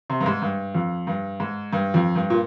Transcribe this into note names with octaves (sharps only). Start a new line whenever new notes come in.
C3
G2
G#2
G2
F2
G2
G#2
G2
F2
G2
A#2